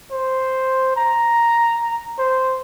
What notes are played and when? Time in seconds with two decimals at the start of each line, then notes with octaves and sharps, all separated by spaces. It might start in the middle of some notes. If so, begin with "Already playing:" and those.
0.12 C5
0.96 A#5
2.18 C5